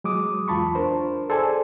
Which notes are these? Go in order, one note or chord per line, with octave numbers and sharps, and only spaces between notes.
F#3 G#3 D6 D#6
E2 F4 A5 B5 C#6
D4 A#4 C5
G#4 A4 C5 D5 G#5 A5